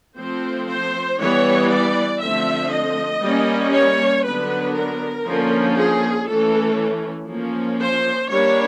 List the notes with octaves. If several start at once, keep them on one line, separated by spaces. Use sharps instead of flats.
F3 A3 C4 C5
C5
E3 G3 B3 C#5
D5
D3 F3 A3 C4 E5
D#5
G3 A#3 C#4
C#5
D3 F#3 B3 D4 B4
A#4
D3 F3 A#3 C#4
G#4
E3 A3 C#4 A4
F3 A#3 C#4
C5
G3 A#3 D4 C#5